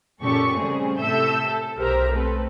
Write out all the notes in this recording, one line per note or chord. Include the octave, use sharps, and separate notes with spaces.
F#2 A#2 C#3 G4 A4 C#6
C#3 G3 A3 C4 G#4
A2 C3 A4 E5 E6 G6
A4
B1 G4 A#4 C5 E5 A#5
A3 C4 A4 B4